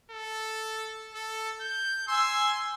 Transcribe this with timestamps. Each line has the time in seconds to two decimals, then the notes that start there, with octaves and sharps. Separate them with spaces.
0.12 A4
1.15 A4
1.61 G6
2.08 G#5 C6 E6